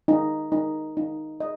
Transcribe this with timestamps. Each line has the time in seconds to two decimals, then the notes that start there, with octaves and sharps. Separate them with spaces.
0.08 D#4
0.52 D#4
0.97 D#4
1.40 D#5